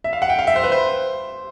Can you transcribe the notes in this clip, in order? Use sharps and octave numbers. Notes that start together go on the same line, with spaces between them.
E5
F5
F#5
G5
F5
E5
C5
B4
C5